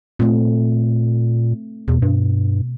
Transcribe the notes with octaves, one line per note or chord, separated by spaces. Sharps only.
A#2 A3 C4
E2 B2
G2